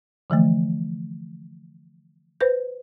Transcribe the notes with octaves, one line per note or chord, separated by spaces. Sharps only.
D3 E3 F3 A3
B4 C5 G6